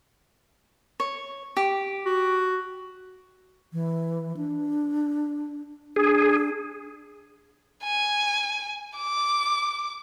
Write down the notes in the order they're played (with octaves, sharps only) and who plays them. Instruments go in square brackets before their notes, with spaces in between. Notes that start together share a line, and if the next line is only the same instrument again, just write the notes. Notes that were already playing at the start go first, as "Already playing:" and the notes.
[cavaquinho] C#5
G4
[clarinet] F#4
[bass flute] E3
D4
[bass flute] D4 [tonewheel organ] G#4
[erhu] G#5
D6